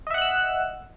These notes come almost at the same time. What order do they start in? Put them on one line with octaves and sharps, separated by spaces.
D#5 E5 F#5 F#6 E6